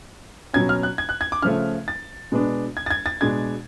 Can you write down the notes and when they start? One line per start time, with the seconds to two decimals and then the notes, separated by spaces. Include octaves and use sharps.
0.53 B2 F#3 C#4 G#6
0.69 F6
0.83 F#6
0.98 G#6
1.09 F#6
1.21 G#6
1.32 D6
1.42 C#3 F3 A3 F6
1.88 A6
2.32 B2 G#3 B3 D4
2.77 G#6
2.86 A6
2.91 G#6
3.06 A6
3.20 B2 G#3 D4 G#6